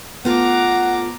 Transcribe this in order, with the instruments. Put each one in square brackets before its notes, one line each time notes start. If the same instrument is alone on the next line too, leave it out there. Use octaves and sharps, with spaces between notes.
[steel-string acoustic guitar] A3 F4 D5 [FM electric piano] B3 [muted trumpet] F#5 [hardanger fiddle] A#5 D6